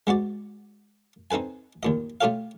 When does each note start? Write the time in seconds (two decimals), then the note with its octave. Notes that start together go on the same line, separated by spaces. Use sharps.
0.07 G#3 B3 F#4 D5
1.31 C4 D#4 A4 B4 G#5
1.83 D#2 A#2 D#5
2.21 A3 F4 G4 A4 C#5 F5